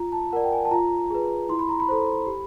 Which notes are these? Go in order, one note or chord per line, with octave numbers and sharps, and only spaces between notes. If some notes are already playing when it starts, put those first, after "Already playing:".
Already playing: F4 A#5
A5
A#4 D5 F#5
G5
G#5
A5
F4 A#5
G#4 B4
E4 C6
B5
A#5
B5
A4 C5
G4